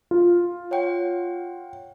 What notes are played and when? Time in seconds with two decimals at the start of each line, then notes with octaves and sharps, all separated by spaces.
0.11 F4
0.71 C#5 F#5 G5